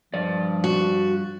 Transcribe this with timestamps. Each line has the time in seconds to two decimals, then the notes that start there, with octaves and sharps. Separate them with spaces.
0.14 G2 F3 D5
0.64 F#4